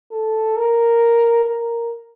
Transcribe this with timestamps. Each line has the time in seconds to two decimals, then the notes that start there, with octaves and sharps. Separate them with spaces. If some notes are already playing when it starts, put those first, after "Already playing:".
0.12 A4
0.56 A#4
1.45 A#4